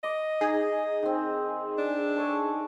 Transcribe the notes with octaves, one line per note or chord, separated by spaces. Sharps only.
D#5 D6
D#4 G#4
D#3 C4
D4
A4 C#5 G#5